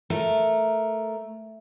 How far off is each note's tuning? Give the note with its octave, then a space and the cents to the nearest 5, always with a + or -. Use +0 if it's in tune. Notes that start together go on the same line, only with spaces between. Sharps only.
A3 +0 A#4 +0